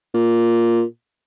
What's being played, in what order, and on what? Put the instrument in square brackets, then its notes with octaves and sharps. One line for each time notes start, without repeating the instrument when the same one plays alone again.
[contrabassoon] A#2